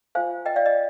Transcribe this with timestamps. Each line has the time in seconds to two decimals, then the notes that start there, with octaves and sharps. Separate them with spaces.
0.15 F4 C5 F5 G#5
0.46 D#5 G5
0.56 D5 F5
0.66 D#5